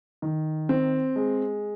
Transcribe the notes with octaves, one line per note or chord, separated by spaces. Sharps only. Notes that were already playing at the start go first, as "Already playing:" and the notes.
D#3
C4
G#3